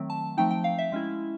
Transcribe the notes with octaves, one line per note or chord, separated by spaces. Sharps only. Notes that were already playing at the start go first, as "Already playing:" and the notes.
Already playing: D#3 F#3 A3 C4
A5
F3 A3 C4 D#4 G5
G5
F5
E5
G#3 C#4 E4